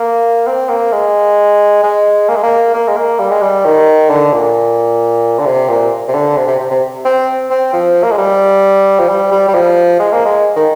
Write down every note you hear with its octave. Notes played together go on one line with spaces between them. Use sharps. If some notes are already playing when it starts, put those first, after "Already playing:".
Already playing: A#3
C4
A#3
G#3
G#3
A#3
G#3
A#3
A#3
G#3
A#3
G3
G#3
G3
D#3
D3
A#2
D3
C3
A#2
C3
D3
C3
C3
C3
C3
C4
C4
F3
A#3
G#3
G3
F3
G3
G3
G3
F3
G#3
A#3
G#3
D#3